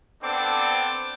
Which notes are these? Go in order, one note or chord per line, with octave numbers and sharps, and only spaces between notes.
B3 C4 D4 A4 D6